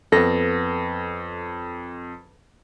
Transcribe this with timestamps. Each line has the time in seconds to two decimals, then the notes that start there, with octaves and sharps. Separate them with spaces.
0.12 F2 B3 A4 A#6